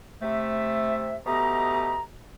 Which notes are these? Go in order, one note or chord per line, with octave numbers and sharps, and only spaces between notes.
C3 A3 E5
B2 A3 B3 G4 D#5 A#5